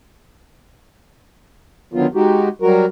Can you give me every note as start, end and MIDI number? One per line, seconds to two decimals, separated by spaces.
1.94 2.07 50
1.94 2.07 51
1.94 2.07 54
1.94 2.07 59
1.94 2.07 65
2.15 2.49 56
2.15 2.49 63
2.15 2.49 66
2.15 2.49 67
2.62 2.86 54
2.62 2.86 55
2.62 2.86 66
2.62 2.86 70